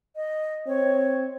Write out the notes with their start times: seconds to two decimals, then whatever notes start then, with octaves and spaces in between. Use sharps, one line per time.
0.16 D#5
0.67 C4 C#5